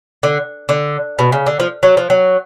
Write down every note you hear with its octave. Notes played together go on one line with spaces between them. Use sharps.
D3
D3
B2
C#3
D3
F3
F#3
F3
F#3